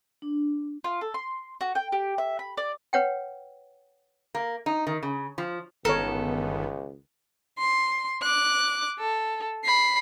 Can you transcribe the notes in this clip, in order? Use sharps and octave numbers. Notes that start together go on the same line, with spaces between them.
D4
F4
A4
C6
F#4
G5
G4
E5
B5
D5
B4 C#5 F#5 G5
A#3
D#4
D#3
C#3
F3
G1 C#2 D#3 B3 A4 A#4 C#5
C6
D6 F#6
A4
B5 C7